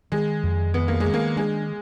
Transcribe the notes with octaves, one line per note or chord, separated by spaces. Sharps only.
D#3 G#3
F2
D#3 B3
A#3
D#3 G#3
A#3
G#3 D4